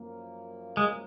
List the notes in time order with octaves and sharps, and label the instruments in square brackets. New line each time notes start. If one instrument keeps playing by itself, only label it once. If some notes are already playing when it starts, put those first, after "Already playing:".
Already playing: [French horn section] F#2 F3 A#3
[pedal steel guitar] G#3